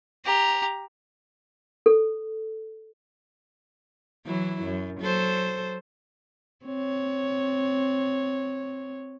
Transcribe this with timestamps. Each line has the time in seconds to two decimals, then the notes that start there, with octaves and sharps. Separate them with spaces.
0.25 G4 A#5
1.86 A4
4.26 E3 F#3 E4
4.63 F#2
5.01 F#3 A4 C5
6.65 C4 C#5